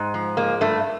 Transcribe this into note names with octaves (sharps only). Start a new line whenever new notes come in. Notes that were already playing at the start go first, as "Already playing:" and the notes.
Already playing: G#2
F3
G#3 A#3
G2 A3